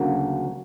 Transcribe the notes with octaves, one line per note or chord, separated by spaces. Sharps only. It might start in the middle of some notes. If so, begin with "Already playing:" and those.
Already playing: D2 C#3 F#3 A#3